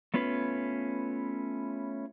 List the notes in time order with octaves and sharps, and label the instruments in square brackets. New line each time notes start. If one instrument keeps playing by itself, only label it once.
[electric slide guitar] A3 B3 C#4 F4 B4